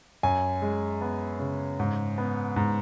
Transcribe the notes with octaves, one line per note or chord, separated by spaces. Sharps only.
F#2 G#5
G#3
B3
C#3
G#2
B3
G#2